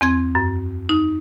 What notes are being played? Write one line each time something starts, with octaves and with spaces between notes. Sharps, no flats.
E2 C4 G#6
F#2
D#4